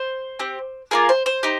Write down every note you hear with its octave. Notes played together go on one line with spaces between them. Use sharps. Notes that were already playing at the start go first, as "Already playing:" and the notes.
Already playing: C5
C4 G4
A#3 F4 G#4 A#4
C5
C5
D#4 G4